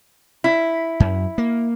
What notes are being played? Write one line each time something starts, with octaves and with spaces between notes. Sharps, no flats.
E4
F#2
A#3